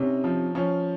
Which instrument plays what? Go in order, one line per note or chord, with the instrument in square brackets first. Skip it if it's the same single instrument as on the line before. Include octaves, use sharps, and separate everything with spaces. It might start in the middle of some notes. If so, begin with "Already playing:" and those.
Already playing: [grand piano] C3 [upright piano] C#4 D#4
[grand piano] F3
[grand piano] F3 [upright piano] C#4